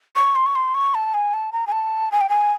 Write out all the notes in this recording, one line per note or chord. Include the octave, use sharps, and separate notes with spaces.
C#6
C6
C#6
C6
C#6
A5
G#5
A5
A#5
G#5
A5
G#5
G5
G#5